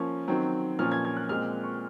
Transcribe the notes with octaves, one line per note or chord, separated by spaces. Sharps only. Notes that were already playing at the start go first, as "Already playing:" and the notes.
Already playing: F3 A#3 C#4
D#3 F#3 C4
A#2 F3 A#3 C#4 F6
G#6
G#6
F#6
A#2 G#3 C4 F6
C#6